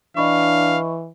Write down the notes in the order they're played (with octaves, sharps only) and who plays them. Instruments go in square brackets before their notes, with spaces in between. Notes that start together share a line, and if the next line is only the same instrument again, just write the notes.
[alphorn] E3 [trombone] D4 [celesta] D#5 B5 C#6 [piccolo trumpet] F5